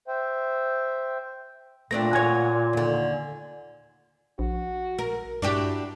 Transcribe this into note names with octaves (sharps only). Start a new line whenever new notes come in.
C5 E5 G5
A#2 A3 C4 D4 A#6
F#4 C#5 G#5 G#6
D#2 D3
A#1 F#4
A#4
G2 D4 E4 F#4 G4